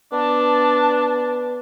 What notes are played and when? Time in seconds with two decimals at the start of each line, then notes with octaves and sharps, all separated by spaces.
0.12 B3 D4 A5